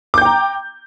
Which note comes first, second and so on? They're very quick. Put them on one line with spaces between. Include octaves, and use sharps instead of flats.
D6 G6 G5 A#5